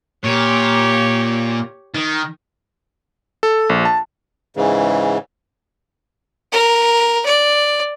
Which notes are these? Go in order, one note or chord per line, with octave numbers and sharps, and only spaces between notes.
A#2 G4 C#5
D#3
A4
A#1
A5
G#2 C#3 E3
A#4
D5